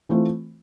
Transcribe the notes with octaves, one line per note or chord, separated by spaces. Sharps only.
E3 A3 C4 F4